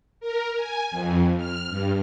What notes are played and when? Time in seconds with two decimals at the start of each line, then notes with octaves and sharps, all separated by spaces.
0.20 A#4
0.56 G#5
0.91 F2
1.37 F6
1.69 G2